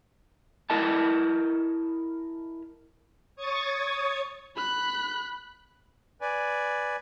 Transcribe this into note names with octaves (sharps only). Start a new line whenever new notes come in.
E4 A#4 D#5 A5
C#5 C#6 D#6 G#6 A6
B5 F#6
B4 D5 G#5